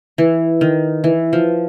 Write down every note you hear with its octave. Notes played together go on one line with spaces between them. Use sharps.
E3
D#3
E3
F3